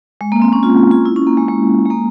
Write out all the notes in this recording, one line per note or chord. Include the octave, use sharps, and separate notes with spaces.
G#3
A#3
C4
C#4
F4
F4
F4
E4
C#4
A#3
G#3
G#3
G#3
A#3